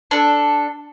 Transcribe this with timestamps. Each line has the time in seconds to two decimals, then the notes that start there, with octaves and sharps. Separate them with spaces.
0.11 D4 A4